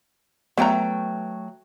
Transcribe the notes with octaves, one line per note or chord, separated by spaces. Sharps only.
F#3 A3 B3 G5 A#5